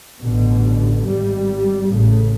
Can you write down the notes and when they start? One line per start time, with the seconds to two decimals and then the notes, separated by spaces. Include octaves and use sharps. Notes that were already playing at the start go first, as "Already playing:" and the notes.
0.20 A1 B2 D3
1.02 G#1 G3
1.87 A1 A2 C#3 A3